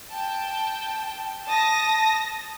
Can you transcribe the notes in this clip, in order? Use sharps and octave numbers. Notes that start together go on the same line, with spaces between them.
G5 A5
A5 D#6 A#6